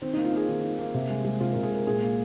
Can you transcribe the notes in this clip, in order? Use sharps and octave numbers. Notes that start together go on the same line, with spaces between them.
D#3 C4
D#4
A#3
F4
A#3 G#4
D#3
D#3
A#3
C3
G#3
G#3
C3 F4
A#4
C3
G#4
G#3 A#4
A#2 G#4
A#3